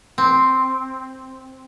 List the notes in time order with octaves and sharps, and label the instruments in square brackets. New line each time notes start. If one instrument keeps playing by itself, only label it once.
[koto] C4